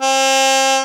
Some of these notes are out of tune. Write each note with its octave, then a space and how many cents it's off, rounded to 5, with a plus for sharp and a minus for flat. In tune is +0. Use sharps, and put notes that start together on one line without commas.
C4 +40